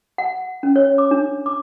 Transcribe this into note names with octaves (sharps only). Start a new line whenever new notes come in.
F#5
C#4
C#5
D6
D4
D6